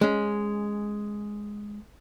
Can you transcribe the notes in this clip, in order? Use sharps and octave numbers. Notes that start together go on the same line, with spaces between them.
G#3 C#4